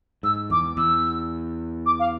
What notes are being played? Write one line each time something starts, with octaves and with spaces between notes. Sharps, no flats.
G#2 E6
E2 D6
E2 E6
D6
F5